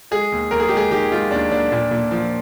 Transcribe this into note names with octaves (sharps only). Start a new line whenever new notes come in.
G#3 G#4
D#2
D#2 A#4
G#4
G#3 G4
G#4
D#3 G4
G#3 F4
D#2 D4
D#2 D4
A#2
A#2
F3